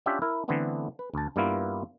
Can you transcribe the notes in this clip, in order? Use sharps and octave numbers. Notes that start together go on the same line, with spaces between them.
C#4 D4 F4 G4 E5
E4 A#4
D3 E3 A3 B3 C4 D4
B4
D2 A5
G2 G3 A#3 B3 E4 F4